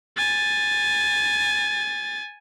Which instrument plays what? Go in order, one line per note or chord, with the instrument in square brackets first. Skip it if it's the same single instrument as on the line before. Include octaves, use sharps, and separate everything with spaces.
[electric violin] G#5 A6